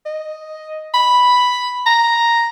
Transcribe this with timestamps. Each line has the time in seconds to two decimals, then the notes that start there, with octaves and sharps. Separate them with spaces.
0.06 D#5
0.94 B5
1.86 A#5